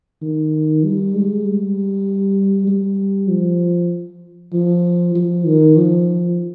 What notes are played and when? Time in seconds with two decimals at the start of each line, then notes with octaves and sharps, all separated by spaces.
0.22 D#3
0.84 G3
1.15 G#3
1.46 G3
2.68 G3
3.29 F3
4.53 F3
5.15 F3
5.46 D#3
5.77 F3